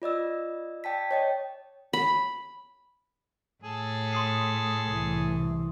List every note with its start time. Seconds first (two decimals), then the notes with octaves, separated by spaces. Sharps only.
0.02 F4 D5 D#5 E6
0.84 D5 G5 A5 B6
1.11 C#5 D#5 G5
1.93 B5
3.63 A2 G#4 A4
4.13 C6 D#6 C7
4.87 C2 E3